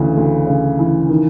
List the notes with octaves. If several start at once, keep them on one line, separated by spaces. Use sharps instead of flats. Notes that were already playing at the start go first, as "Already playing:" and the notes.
Already playing: D2 C#3 E3
D2
C#3
E3
D#3